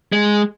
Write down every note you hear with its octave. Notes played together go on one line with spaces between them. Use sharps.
G#3